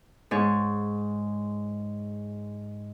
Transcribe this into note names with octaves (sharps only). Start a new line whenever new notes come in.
G#2 C#5